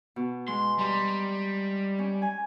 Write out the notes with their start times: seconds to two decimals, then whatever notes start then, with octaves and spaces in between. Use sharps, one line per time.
0.16 B2
0.48 G#3 C6
0.79 G3 A#5 C6
1.98 C#4
2.22 G#5